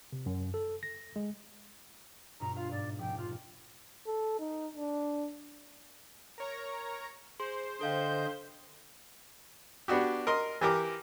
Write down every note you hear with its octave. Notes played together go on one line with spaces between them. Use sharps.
C3
F#2
A4
A#6
G#3
G2 B2 F4 A#5
F4 F5
G#2 D5
F1 G5 D6
F4 F6
A4
D#4
D4
A#4 C#5 A#5
G#4 C5
D3 A4 D#5 F5 G5 G6
B3 D4 F#4 G4
A#4 D#5 C6
E3 G4 A#4 D6